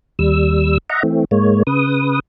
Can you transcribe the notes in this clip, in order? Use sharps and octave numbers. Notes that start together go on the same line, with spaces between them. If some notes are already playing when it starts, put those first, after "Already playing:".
D#2 G3 E6
D#5 E5 F#5 A#5
E3 A3 C4
G#2 G#3 A#3 C#5
C#3 B4 D#6